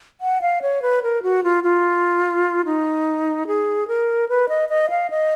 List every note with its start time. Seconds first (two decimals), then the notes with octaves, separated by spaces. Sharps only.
0.21 F#5
0.42 F5
0.62 C#5
0.82 B4
1.03 A#4
1.23 F#4
1.44 F4
1.64 F4
2.65 D#4
3.47 G#4
3.88 A#4
4.29 B4
4.49 D#5
4.69 D#5
4.90 F5
5.10 D#5